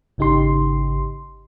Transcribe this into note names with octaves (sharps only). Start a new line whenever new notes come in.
G#1 C#3 D#4 G4 C6